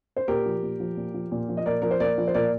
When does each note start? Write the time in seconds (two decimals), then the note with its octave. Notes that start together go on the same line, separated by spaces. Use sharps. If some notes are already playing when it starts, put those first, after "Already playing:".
0.16 C5
0.28 A#2 G4 A#4
0.45 F3
0.62 A#2
0.80 F3
0.97 A#2
1.14 F3
1.32 A#2
1.49 F3
1.57 D#5
1.66 A#2 A#4 D5
1.82 F3 A#4
1.91 C5
2.00 A#2 A#4 D5
2.18 F3
2.27 C5
2.34 A#2 A#4 D5